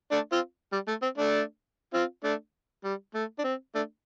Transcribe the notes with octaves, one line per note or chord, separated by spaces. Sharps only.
A3 D4
C4 F4
G3
A3
C4
A3 D4
C4 F4
A3 D4
G3
A3
D4
C4
A3 D4